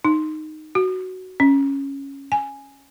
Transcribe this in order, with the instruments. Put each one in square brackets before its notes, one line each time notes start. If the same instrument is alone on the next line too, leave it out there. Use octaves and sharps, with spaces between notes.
[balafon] D#4
F#4
C#4
G#5